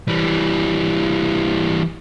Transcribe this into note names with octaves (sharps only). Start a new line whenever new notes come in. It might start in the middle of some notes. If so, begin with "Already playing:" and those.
E3 G3